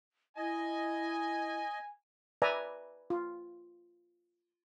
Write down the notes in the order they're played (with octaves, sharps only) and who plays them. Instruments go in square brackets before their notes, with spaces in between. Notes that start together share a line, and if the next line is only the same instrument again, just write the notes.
[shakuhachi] E4 [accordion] D#5 [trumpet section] G#5
[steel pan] B4 D5 E5 G#5 A#5
F4